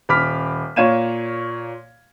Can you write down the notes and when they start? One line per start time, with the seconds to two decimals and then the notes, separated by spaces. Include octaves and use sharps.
0.09 D#1 B5 D6 F6 B6
0.76 A#2 C#5 F5 G#6 D#7 E7